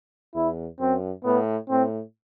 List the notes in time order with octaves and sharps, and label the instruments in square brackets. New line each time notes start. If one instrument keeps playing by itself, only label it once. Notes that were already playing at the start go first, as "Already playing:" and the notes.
[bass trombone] E2 [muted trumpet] E4
[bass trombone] F#2 [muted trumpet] C4
[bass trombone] A2 [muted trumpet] B3
[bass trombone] A2 [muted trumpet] C4